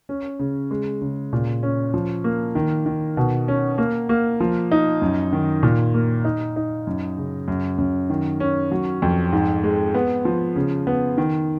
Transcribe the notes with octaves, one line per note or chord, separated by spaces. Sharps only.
C#4
C#3
G#3
C#3
A#2
C#4
F3
A#3
D#3
D#3
B2
C#4
A#3
A#3
F3
D#4
F#2
D#3
A#2
A#3
D#4
D#4
F#2
C#3
F#2
F#2
D#3
C#4
F#3
F2
G#2
G#3
B3
F3
C#3
B3
D#3